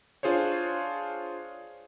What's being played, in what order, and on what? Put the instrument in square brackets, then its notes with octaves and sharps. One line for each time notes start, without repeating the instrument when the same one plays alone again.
[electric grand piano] D4 F4 G#4 C5 C#5